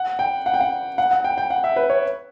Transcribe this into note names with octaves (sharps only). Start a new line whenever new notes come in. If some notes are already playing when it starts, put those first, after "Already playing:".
Already playing: F#5
G5
F#5
G5
F#5
F#5
F#5
G5
G5
F#5
E5
B4
C#5